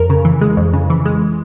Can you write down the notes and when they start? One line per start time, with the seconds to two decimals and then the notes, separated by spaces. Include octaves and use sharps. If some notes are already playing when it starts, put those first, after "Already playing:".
Already playing: F2 A#4
0.10 C#3
0.25 E3
0.41 G#3
0.57 F2
0.73 C#3
0.90 E3
1.05 G#3